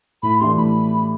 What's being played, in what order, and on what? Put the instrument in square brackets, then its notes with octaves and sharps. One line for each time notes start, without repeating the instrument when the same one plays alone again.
[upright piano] A2 [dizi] B5
[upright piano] E3 A3 D4 G4 [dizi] C6
[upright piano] A2 [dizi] B5